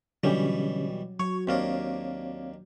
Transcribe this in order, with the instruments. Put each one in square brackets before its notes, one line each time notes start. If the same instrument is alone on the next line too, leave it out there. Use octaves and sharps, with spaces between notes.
[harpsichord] B2 E3 G3 [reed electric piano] D3 C#4 G4 [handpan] F#3
[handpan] F#3 [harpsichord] C#5 [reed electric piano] C#6
[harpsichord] D#2 A#3 D4 [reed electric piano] C4 C#5 F5